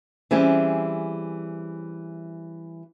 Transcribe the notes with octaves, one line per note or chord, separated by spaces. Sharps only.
E3 G3 C4 C#4 G#4